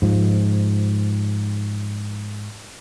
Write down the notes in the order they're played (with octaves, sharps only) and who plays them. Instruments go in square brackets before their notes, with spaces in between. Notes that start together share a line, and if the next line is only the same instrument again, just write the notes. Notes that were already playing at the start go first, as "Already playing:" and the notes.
[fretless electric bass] G#2 F3